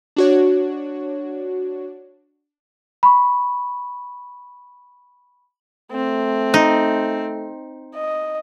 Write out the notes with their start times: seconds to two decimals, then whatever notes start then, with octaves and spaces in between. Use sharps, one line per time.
0.16 D4 F#4 C#5
3.03 B5 C#6
5.92 A3 C4
6.54 D#4
7.95 D#5